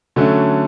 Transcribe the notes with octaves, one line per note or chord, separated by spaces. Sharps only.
D3 F#3 A3 C#4